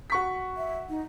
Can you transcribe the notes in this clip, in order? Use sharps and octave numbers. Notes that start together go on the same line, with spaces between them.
F#4 C#6 B6
E5
D#4